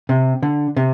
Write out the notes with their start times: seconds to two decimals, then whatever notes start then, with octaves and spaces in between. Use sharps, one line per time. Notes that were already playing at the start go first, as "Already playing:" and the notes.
0.09 C3
0.42 D3
0.76 C3